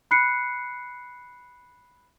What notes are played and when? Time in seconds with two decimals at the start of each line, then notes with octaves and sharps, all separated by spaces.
0.11 B5 F#6 C7 C#7